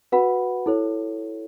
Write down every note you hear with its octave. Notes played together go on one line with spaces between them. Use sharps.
F#4 B4 F#5 B5
E4 A4 C#5